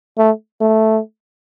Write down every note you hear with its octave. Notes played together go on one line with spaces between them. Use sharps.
A3
A3